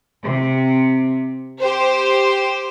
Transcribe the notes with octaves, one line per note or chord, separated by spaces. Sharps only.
C3
G4 C5